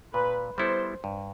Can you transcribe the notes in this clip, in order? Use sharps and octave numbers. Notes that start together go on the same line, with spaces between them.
A#2 B4
G3 B3 E4 A4 C5
G2